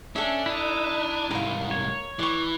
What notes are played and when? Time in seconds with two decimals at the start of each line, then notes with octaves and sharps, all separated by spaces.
0.16 C#4 D4 A4 E5
0.46 D#4 E4
1.31 C2 G#2 A#4 F5
1.71 C#5
2.19 E3 D5 C#6